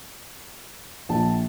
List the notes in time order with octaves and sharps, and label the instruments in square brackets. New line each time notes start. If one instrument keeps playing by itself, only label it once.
[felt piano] A#1 [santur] A5